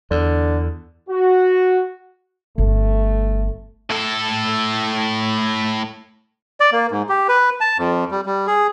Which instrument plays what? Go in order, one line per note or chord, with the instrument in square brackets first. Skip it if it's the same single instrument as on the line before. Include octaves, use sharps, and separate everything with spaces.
[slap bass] E2 [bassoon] D3
[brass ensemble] F#4
[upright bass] G1 [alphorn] A3
[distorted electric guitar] A2 A4
[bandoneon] D5
A#3
G#2
G4
B4
A5
F2
G3
G3
G#4